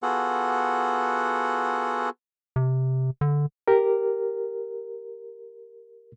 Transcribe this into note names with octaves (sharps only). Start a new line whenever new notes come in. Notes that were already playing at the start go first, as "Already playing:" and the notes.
B3 F4 F#4 G#4 A4 F#5
C3
D3
G4 A#4